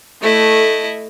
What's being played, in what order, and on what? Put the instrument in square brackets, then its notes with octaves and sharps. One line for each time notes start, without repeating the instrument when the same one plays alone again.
[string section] A3 [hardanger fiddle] E4 D#5